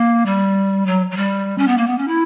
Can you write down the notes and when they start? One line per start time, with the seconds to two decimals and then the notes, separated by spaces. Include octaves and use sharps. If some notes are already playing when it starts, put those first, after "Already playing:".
Already playing: A#3
0.26 G3
0.86 F#3
1.11 F#3
1.17 G3
1.58 C#4
1.68 B3
1.78 A#3
1.87 B3
1.98 C#4
2.08 E4